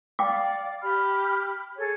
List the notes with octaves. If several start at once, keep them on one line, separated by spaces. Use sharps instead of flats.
D5 F5 G5 D6
G4 B5 F6
G#4 A4 C#5